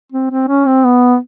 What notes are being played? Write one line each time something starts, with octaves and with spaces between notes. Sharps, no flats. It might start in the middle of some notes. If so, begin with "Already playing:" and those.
C4
C4
C#4
C4
B3